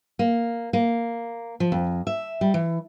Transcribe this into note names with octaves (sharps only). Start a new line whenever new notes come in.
A#3
A#3
F3
F2
E5
G3
E3